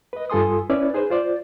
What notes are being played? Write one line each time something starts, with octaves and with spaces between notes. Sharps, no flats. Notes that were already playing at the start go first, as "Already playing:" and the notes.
B4 D#5
G2 F4 A4 G#5 C6 D#6
C#4 E4 B4 C#5 D5
D#4 G#4 B4 C5
F4 C5 D5